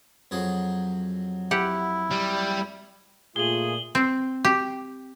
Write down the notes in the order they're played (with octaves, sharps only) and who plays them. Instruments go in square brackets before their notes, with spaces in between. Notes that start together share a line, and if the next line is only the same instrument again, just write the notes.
[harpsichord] F2 F#3 G#4
[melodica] E4 [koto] G4 F#5
[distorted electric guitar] G3
[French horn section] A#2 [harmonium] A3 F4 [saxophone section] G#4 [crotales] F#7 G7
[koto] C4
G4